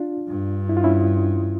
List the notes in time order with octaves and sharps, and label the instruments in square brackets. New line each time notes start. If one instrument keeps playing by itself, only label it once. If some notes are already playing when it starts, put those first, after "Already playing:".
Already playing: [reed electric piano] D4 F4
[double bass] G2
[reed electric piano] E4
F4
C#4 E4